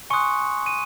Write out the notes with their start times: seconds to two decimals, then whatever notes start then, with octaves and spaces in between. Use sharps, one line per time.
0.10 G#5 C6 C#6 D#6 F#6 C#7
0.66 D#7